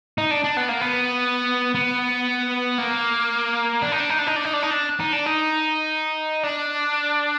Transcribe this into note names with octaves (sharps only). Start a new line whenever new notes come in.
D#4
D4
D4
B3
A#3
B3
B3
A#3
D4
D#4
D4
D#4
D4
D#4
D4
D#4
D4
D#4
D4
D#4
D4
D#4
D4